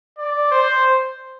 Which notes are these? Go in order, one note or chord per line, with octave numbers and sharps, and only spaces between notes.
D5
C5